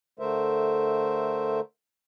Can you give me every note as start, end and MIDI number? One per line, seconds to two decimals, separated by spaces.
0.19 1.60 50
0.19 1.60 57
0.19 1.60 70
0.19 1.60 72
0.19 1.60 76